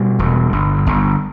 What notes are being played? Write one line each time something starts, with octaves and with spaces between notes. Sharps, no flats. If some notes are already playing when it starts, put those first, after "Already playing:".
Already playing: B2 G3
E1
G1
G1